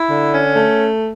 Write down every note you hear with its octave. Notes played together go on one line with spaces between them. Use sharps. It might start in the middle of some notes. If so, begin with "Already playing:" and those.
Already playing: E4
D3
C#4
A3